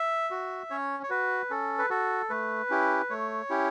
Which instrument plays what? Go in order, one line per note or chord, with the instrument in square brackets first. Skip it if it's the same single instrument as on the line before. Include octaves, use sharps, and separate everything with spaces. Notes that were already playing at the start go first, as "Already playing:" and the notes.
Already playing: [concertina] E5
F#4
C#4 C#5
C#5
F#4 B4
C#4 A4
B4
F#4 A4
A3 B4
C#4 E4 G4
A3 C#5
C#4 E4 G4